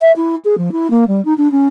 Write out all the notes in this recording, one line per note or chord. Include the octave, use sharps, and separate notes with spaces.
E5
E4
G#4
F3
E4
A#3
G3
D#4
D4
C#4